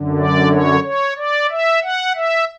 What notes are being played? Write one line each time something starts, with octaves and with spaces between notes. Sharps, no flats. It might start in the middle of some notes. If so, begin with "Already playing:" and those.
Already playing: F#2 D3
D5
C#5
C#5
D5
E5
F#5
E5